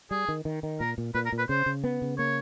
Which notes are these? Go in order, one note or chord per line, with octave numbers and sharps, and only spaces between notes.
G3 G#4
D#3
D#3
D#3
A#2 A#4
A#2
A#2 B4
A#4
A#2
B4
C#3 C5
C#3
B3
C#3
A#3 C#5